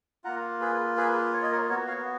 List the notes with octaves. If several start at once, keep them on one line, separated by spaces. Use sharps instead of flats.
A#3 F4 F#5 A#5
G#4 B4
G#4 B4
C#5
D#5
A#4 C#5
B3 F#4 A#4 C#5
C#5 F5